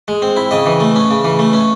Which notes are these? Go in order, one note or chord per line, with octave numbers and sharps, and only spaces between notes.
G#3
C4
E4
C#3 D#5
E3
A3
C#4
C#3
E3
A3
C#4